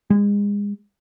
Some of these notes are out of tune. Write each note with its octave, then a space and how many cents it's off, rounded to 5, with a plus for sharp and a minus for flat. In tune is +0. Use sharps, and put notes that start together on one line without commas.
G#3 -30